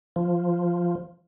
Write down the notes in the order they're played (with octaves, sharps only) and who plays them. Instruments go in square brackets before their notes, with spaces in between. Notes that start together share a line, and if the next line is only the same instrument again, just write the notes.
[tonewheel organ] F3